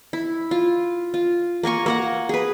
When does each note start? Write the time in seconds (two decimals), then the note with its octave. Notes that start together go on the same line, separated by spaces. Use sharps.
0.13 E4
0.51 F4
1.14 F4
1.63 A#3 A#4 G#5 C#6
1.86 A#3 A#4 F#5
2.29 G#4 B4